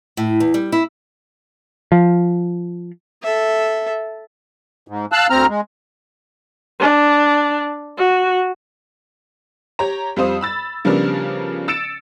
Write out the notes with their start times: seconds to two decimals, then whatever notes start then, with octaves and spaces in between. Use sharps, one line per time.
0.17 A2
0.40 E2
0.54 G3
0.72 E4
1.92 F3
3.23 A4 E5
4.88 G#2
5.12 F5 A5 E6 F#6
5.30 D2 C4 A#5 F6
5.49 G#3
6.80 D4
7.98 F#4
9.79 G4 C#5 A#5
10.16 F2 G3 F4 C5 D#6
10.41 B5 E6 A6
10.85 C#3 F3 G3 B3 D4 A#4
11.68 E6 A6 C#7 D7 E7